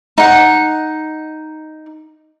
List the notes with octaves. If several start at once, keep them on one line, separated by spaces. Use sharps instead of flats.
D#4 F#5